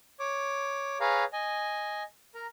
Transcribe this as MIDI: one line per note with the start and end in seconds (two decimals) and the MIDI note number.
0.20 0.98 73
0.20 0.98 86
1.00 1.24 68
1.00 1.24 71
1.00 1.24 73
1.00 1.24 77
1.00 1.24 82
1.33 2.03 75
1.33 2.03 80
2.35 2.47 70
2.35 2.47 82